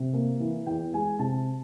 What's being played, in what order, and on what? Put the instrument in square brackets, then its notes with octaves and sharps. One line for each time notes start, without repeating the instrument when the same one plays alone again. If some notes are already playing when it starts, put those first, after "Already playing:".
Already playing: [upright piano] C3
A#3
E3
E2 G5
G#3 G#5
C3 A5